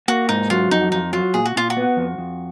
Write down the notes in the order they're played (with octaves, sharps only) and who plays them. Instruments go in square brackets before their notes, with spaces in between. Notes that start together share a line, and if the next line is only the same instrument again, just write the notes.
[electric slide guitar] A#3 [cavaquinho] F#4
[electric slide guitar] G#2 [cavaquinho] D#4
[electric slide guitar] F#3 [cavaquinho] F4
[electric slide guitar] F2 [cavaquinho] D#4
[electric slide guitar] F2 [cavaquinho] D#4
[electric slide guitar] F#3 [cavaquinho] F4
[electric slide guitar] A#2 [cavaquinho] G#4
[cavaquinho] F#4
[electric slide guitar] A#2 [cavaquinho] F4
[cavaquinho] F#4
[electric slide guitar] B3
F2
F2